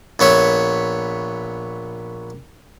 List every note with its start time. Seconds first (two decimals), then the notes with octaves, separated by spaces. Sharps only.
0.19 A#1 B3 C#5 E5